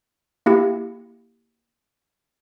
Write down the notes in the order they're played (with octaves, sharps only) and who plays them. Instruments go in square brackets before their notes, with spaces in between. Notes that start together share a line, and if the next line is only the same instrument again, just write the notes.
[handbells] A#3 E4 G4